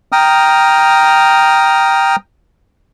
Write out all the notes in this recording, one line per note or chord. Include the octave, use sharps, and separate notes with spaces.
G5 A#5 D#6 F6